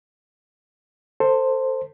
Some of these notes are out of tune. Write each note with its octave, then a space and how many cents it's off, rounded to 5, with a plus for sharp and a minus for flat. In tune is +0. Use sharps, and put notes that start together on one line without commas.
A4 +25 C5 +0